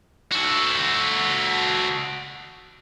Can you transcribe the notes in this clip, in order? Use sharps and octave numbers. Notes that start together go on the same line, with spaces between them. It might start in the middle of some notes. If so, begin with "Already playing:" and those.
F#4 A4